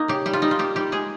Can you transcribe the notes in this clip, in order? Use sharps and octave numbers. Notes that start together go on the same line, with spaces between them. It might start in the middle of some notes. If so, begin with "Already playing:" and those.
Already playing: A#3 D#4
C#3 G4
G3 G4
F4
G3 D#4
F4
A#3 G4
G3 G4
G#3 G#4